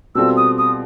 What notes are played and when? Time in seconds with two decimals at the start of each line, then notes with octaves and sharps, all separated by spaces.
0.15 B2 G3 C4 F4 A4 E6
0.37 D#6
0.58 D#6